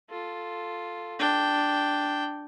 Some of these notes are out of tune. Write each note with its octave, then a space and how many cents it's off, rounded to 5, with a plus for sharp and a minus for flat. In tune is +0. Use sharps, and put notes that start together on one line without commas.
F4 +0 A4 +0
D4 +0 G5 +0